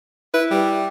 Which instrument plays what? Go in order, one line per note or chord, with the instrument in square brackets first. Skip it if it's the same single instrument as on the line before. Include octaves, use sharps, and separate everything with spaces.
[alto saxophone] E4 [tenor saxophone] B4
[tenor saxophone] G3